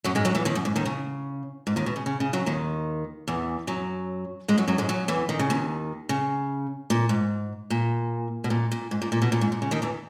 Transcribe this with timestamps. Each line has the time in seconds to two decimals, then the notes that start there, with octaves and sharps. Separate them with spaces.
0.04 F#2 F#3
0.15 G#2 G#3
0.25 F#2 F#3
0.35 E2 E3
0.45 D#2 D#3
0.55 F#2
0.65 G#2
0.76 D#2 D#3
0.85 C#3
1.67 G#2
1.76 D#2 D#3
1.86 B2
1.96 C#3
2.06 C#3
2.20 C#3
2.33 F#2 F#3
2.46 D#2 D#3
3.28 E2 E3
3.67 F#2 F#3
4.48 G#2 G#3
4.58 F#2 F#3
4.68 F#2 F#3
4.78 G#2 G#3
4.89 F#2 F#3
5.08 E2 E3
5.29 D#3
5.39 C#3
5.50 D#2 D#3
6.09 C#3
6.90 A#2
7.09 G#2
7.70 A#2
8.44 B2
8.50 A#2
8.72 A#2
8.91 G#2
9.02 A#2
9.12 A#2
9.22 B2
9.32 A#2
9.41 G#2
9.52 A#2
9.62 C#3
9.71 D#2 D#3
9.82 E2 E3